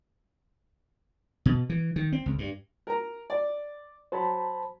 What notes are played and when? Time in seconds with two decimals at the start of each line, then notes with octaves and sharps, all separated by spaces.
1.46 B2
1.70 E3
1.96 D#3
2.12 C4
2.26 C#2
2.39 G2
2.87 A#4 A#5
3.30 D5
4.12 F#3 C5 A5 B5